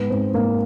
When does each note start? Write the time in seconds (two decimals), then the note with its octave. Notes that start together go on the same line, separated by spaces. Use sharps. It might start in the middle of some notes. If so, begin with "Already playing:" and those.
Already playing: G#2 B3
0.10 G#2 C4
0.34 G#2 A#3